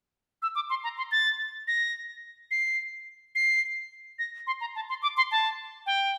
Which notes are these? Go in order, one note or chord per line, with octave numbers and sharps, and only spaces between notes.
E6
D6
C6
A#5
C6
A6
A#6
C7
C7
A#6
C6
A#5
A5
C6
D6
C6
A5
G5